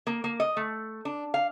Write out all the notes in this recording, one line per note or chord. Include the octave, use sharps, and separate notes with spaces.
A#3
A#3
D#5
A3
D4
F5